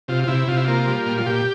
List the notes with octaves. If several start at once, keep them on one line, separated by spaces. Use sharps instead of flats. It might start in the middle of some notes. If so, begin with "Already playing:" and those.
C3 F4
F4
C3 E4
C3 F4
E4
A#3 F4
G3
A#2
F4
A#2 G4